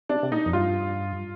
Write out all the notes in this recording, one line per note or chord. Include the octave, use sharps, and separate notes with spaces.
C3 D4
C3
A#2 D#4
F2
G2 F4